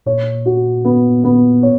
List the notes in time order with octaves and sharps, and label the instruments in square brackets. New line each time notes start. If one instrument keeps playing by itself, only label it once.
[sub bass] A#2 [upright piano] C#5
[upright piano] F#4
B3
B3
C#5